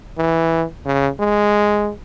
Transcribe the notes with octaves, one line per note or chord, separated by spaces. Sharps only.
E3
C#3
G#3